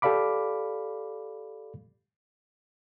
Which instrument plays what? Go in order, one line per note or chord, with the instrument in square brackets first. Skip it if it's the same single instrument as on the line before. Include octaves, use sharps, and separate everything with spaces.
[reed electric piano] G4 A4 D5 F5 B5 D6